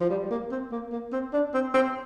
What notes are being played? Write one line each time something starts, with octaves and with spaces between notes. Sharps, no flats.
F3
G3
G3
A#3
C4
A#3
A#3
C4
D4
C4
C4